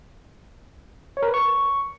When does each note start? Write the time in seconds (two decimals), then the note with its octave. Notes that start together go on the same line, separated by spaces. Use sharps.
1.17 C#5
1.23 A#4
1.28 B4
1.34 C#6